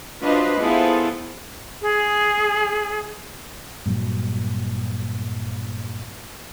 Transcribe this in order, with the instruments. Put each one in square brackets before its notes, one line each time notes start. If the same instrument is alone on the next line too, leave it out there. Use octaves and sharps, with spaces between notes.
[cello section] D4 F4 F#4 B4 C5 D#5
B3 E4 F4 G#4 A4 C5
[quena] G#4
[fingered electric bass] G2 A#2 F#3